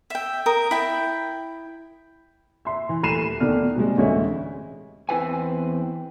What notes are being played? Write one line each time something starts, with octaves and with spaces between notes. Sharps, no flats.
E5 G5
A#4 D#6
E4 G5
E5 C6
E3
D#1 A3 B5 C7 D#7 E7
D2 D#3 A3 B3 D4 F6
C3 G3 G#3
A1 D2 G#3 C#5 D#5 E5
E2 C4 E4 B4 G#5